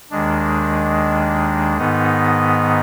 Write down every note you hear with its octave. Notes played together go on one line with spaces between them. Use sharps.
D#2 D#3 G#3 D4
G#2 D#3 B3 D#4